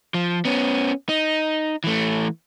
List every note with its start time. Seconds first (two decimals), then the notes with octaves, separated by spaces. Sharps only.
0.14 F3
0.45 B3 C#4
1.09 D#4
1.84 E3 A3